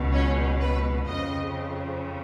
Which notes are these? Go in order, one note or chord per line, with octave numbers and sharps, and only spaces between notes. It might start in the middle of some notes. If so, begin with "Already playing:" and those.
Already playing: C#2 B2
C#4
B4
F2 C#3 D#5